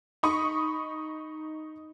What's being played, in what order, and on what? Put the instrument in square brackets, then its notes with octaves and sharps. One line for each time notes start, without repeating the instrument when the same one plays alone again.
[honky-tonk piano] D#4 B5 C#6 D#6